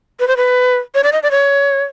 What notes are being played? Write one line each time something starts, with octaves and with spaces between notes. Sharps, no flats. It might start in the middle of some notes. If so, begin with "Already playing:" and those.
B4
C5
B4
C#5
D5
D#5
D5
C#5